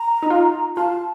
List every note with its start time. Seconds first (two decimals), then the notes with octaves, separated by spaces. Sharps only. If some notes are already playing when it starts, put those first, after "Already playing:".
Already playing: A#5
0.23 D#4
0.30 F4
0.77 F4 A5